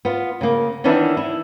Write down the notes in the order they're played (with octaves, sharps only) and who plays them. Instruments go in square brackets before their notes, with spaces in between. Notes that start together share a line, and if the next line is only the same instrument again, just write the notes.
[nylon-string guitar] B3 F4
C#3 A#3
D#3 E3 B3 C#4 D4 E4
E4